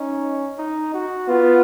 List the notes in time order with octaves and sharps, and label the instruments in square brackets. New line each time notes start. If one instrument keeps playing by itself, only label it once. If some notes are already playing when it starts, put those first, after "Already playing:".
Already playing: [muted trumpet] C#4 [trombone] D#4
[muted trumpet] D#4
F#4
[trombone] B3 [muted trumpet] F4